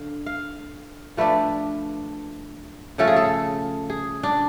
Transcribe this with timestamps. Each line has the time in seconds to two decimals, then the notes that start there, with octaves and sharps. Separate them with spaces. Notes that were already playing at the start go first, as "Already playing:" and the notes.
Already playing: D3 F5
0.26 F5
1.17 F3 A3 D4 B4
2.98 C#3 F3 A3 C#4 A4
3.07 G#4
3.16 A4
3.90 G#4
4.23 D4